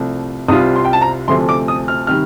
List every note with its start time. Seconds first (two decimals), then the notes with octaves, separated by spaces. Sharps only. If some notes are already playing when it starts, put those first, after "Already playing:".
Already playing: C2 C3 F3 A3
0.48 C2 C3 G3 C4 F4 D#6
0.76 C6
0.85 G5
0.93 A5
1.01 A#5
1.28 D2 C3 F3 A3 C6
1.49 D6
1.68 D#6
1.88 F6
2.07 C3 D#3 G3 F6